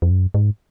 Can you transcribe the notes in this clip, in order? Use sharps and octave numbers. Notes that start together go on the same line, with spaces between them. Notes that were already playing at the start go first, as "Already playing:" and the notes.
F2
F#2
G#2